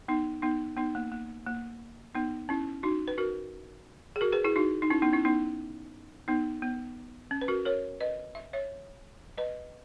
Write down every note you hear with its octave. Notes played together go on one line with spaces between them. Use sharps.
B3 D#4
B3 D#4
B3 D#4
A#3
A#3
A#3
B3 D#4
C#4 E4
D#4 F#4
B4
F#4 A#4
G#4
F#4 A#4
G#4 B4
E4 G#4
D#4 F#4
D#4
C#4 E4
B3 D#4
C#4 E4
B3 D#4
B3 D#4
B3
C#4
B4
F#4 A#4
A#4 C#5
B4 D#5
E5
C#5 E5
B4 D#5